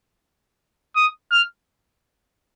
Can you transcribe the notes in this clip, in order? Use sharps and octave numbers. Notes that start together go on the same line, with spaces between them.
D#6
F6